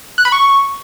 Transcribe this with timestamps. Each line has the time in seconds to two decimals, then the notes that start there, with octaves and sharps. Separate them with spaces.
0.18 F#6
0.25 B5
0.32 C#6